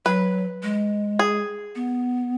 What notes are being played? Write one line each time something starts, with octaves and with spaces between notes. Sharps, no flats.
F#3 B4
G#3
G#4
B3